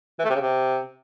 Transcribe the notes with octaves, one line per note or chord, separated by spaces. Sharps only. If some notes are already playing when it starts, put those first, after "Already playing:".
E3
A3
C3
C#3
C3